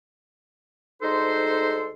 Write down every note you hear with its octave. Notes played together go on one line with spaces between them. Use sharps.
D2 G#3 D#4 A4 C5 C6